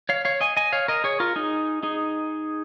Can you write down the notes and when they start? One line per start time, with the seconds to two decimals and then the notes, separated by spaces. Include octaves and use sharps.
0.09 C#5 F5
0.25 C#5 F5
0.41 D#5 G#5
0.57 D#5 G#5
0.73 C#5 F5
0.88 A#4 D#5
1.04 G#4 C#5
1.20 F4 A#4
1.36 D#4 G#4
1.83 D#4 G#4